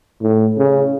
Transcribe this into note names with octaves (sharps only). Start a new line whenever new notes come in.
A2
C#3